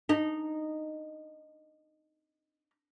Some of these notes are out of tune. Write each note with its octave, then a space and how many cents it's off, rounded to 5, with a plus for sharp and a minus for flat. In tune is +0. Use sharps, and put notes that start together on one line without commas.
D#4 -10